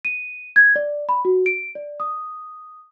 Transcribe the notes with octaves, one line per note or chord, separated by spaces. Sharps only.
D#7
G#6
D5
B5
F#4
D7
D5
D#6